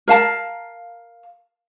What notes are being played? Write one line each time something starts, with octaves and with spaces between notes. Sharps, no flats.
A#4 F5 A5